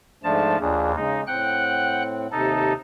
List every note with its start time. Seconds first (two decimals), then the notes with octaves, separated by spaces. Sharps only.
0.24 G#2 F3 A3 D4 A5
0.60 D#2 F3 D4 G#4
0.96 C#3 G#3 D#4
1.27 A2 C4 F#5 G5 F#6
2.32 D#2 C3 D#4 A4 A5